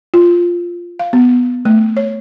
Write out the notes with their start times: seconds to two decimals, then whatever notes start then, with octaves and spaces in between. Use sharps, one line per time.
0.14 F4
0.99 F5
1.13 B3
1.65 A3
1.97 C#5